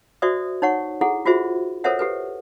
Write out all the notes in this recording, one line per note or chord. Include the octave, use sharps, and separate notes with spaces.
F#4 C5 D5 E5 D#6
D#4 C#5 F#5 C#6
E4 G#4 A4 F#5
F4 F#4 G#4 C5 E5
A4 A#4 C5 C#5 E5 F#5
G4 A4 B4